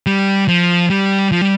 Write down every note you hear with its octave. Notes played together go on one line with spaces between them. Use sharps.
G3
F3
G3
F3
G3